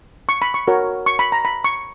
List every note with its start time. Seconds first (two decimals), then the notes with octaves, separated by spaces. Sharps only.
0.29 C#6
0.42 B5
0.54 C#6
0.67 F#4 A#4 C#5
1.06 C#6
1.19 B5
1.32 A#5
1.45 B5
1.64 C#6